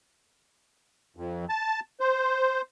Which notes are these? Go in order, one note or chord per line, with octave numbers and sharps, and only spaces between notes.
F2
A5
C5